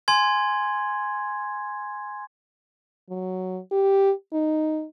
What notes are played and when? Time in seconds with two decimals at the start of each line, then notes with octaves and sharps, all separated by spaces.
0.08 G#5 C6 G#6
3.10 F#3
3.72 G4
4.33 D#4